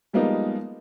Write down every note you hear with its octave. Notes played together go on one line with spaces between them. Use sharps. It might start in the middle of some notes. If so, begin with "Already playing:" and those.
F3 G3 G#3 A#3 B3 D#4